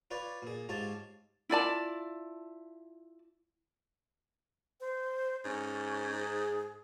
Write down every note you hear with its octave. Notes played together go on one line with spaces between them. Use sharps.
F4 B4 C#5 D5
A#2 G#4
G#2 F4 G4 C#5 A5
E4 F4 D5 A5
C5
G#2 C#4
G#4